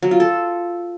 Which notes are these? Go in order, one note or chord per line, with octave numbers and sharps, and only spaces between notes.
F#3
F4
A4